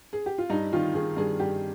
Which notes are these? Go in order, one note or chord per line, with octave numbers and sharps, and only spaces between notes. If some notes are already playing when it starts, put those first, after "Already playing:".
G#4
G4
F4
G2 D#4
D#3 F4
D#3 G#4
G2 G#4
G2 G4